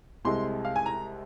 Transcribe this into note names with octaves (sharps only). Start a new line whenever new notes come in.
C2 C3 G#3 C6
F5
G#5
A#5